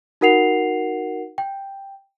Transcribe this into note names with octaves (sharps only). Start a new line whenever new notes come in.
D#4 F#4 A#4 F#5 C7 F7
G5